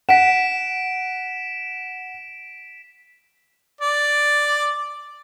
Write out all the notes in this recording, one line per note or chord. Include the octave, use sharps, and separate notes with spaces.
F#5 B6 D7 E7
D5